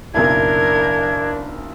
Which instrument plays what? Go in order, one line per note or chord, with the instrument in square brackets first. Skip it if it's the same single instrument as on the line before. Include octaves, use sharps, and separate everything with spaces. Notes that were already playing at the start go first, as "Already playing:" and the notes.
[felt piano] F#1 B1 E4 [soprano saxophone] D4 [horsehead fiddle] A#4 [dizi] G#6